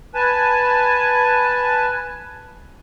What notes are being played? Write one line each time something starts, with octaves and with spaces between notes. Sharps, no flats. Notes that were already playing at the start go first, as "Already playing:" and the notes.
B4 G#5 A5